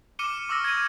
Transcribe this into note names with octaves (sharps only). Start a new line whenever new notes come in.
D6 F6 C#7 D#7 E7 G7
C#6 D6 E6 F6 A#6
G#6 C#7 D#7